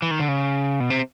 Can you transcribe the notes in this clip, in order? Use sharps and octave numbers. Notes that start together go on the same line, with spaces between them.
E3
D#3
D3
C#3
B2
C3